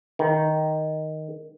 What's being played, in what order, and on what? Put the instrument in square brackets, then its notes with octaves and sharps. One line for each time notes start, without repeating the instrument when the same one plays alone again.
[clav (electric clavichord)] D#3